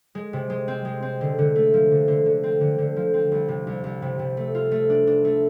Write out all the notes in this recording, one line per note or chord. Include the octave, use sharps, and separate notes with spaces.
G#3
C3
G#3
C4
G#3
C4
D3
D3
A3
F3
D3
D3
D3
C4
D3
D3
F3
C4
C2
C3
C2
C2
C3
C3
A3
F4
A3
D4
D4
A3